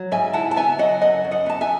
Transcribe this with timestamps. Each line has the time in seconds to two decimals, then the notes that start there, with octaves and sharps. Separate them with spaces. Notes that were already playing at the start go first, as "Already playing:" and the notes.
Already playing: F#3
0.12 G#2 E5 G#5
0.33 E4 F#5 A5
0.51 A5
0.56 B3 E5 G#5
0.78 F#3 D#5 F#5
1.01 F#2 D#5 F#5
1.24 F#2
1.31 D#5 F#5
1.46 B3 A5
1.61 E5 G#5